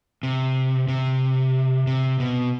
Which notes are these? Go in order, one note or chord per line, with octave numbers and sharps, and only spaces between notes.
C3
C3
C3
B2